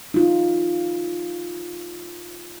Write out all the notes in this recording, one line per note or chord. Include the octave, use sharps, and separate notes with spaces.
D#4 F4